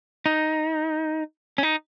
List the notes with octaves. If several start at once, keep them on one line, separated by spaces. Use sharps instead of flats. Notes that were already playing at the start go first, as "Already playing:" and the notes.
D#4
C#4
D#4